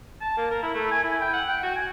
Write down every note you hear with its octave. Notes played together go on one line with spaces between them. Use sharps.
A5
A#3
A#4
E4
A3
G#5
E4
G5
F#5
G5
F#4
G#5